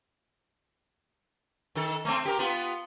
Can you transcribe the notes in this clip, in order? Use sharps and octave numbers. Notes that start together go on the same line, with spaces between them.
D#3 A4
A3 C4
G4 A#4
B3 F4